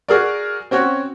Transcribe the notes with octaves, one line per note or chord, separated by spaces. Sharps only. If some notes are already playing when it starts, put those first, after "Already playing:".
F#4 G#4 A#4 D5
C4 C#4 F#4 C#5